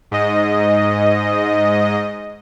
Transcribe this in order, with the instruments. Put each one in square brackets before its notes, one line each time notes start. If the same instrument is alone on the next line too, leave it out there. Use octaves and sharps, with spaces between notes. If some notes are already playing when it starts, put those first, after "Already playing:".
[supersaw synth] G#2 D#5